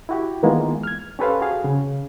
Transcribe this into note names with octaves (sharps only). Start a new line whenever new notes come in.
E4 F#4 G4
D#3 E3 G#3 A#3 B3 F4
F6 G#6
C#4 G4 A4 B4 C5 F5
F#4 G#4 F5
C#3